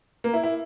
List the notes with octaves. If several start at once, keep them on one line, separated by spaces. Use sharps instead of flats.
A#3
E4
E4